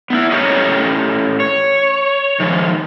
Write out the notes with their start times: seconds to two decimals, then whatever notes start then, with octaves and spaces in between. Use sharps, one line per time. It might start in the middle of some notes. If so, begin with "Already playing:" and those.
0.10 B3 D#4 E4
0.31 A2 C#4 G4 A#4 C#5 D#5
1.40 C#5
2.40 D#3 F3 G#3